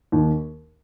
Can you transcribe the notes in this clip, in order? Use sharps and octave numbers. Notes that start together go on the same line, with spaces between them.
D#2